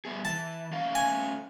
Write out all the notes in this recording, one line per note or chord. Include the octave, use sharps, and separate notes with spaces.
G3 B3 G#4
E3 A5
A3 C#4 F5
G#5